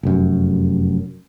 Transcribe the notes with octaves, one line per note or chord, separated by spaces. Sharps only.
F1 F#2